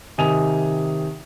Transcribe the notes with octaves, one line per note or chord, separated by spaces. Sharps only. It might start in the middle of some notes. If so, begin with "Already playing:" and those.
C3 D#3 G#5 D#6 D#7 F7